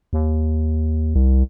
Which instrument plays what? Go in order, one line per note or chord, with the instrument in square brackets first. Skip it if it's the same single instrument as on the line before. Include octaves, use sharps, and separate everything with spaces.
[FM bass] D#2
[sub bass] C2